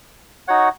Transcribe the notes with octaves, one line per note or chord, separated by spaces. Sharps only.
D#4 F#4 C#5 F#5